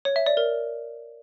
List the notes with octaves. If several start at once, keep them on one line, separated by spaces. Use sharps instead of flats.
C#5
E5
D5
A#4